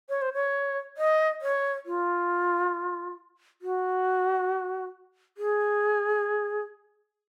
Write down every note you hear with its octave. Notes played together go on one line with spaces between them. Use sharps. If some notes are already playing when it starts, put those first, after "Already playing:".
C#5
C5
C#5
D#5
C#5
F4
F#4
G#4